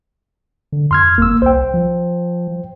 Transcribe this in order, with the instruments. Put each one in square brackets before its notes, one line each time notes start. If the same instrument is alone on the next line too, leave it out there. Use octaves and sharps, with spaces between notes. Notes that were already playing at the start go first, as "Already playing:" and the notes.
[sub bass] D3
[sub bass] F2 [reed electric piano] C6 F6 G#6
[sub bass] G1 [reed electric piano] A#3 E6
[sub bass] C2 [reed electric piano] C5 G5
[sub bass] F3